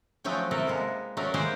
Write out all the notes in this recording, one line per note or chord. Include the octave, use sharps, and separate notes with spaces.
F3 F#3 A3 G5 G#5
C3 E4 A4 A#4
G#3 A#3 B3
F#3 A3 C#4 A4 A#4 D5
G#3 A#3 G4 G#4 B4 C5